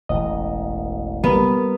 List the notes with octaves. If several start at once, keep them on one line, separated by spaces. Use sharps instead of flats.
E1 A1 D#5
G3 B3 A#4